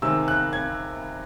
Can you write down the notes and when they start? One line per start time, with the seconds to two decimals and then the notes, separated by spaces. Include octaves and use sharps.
0.02 C3 D#3 G#3 E6
0.28 F#6
0.53 G#6